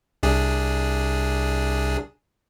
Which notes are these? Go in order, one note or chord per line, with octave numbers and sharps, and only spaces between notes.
C2 D4 G#4